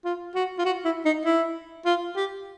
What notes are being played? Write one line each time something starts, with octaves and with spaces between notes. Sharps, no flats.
F4
F#4
F4
F#4
E4
D#4
E4
F4
G4